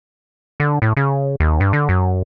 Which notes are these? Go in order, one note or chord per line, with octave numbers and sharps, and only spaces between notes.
D3
A2
C#3
D#2
G2
D3
F#2